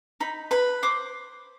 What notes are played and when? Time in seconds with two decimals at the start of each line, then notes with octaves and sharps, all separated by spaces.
0.20 D#4 B5
0.51 B4 B5
0.83 C5 D6